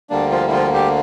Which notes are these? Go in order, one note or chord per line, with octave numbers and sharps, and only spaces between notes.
D2 D3 G3 A#3 D4
F3 F4
E4
F3 F4
G3 G4